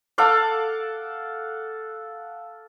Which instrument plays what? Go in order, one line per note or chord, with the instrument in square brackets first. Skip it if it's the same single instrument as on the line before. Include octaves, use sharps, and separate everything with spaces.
[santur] A4 F5 F#5 D6